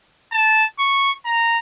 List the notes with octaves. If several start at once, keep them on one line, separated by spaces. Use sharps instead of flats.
A5
C#6
A#5